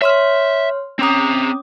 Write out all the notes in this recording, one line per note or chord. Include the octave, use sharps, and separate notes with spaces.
C#5 E5 C6 F6
C4 C#4 A#5 D6 D#6